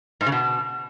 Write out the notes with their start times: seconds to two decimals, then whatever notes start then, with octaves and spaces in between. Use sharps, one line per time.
0.21 G#2
0.26 C#3
0.32 B2